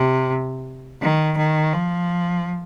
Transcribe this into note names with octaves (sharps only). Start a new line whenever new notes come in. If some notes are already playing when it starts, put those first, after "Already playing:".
Already playing: C3
D#3
D#3
F3